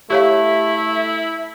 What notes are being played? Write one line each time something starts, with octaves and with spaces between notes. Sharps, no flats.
A3 E4 G4 C#5 E5 F5